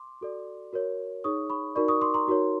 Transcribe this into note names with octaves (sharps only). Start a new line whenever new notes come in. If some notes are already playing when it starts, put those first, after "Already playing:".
Already playing: C6 D6
F#4 A4 D5
F#4 A#4 C#5
D#4 G#4 C#5 C#6 D#6
B5 C#6
D#4 F#4 A#4 D5 B5 C#6
C#6 D#6
C6 D6
A#5 C6
D#4 F#4 A#4 C#5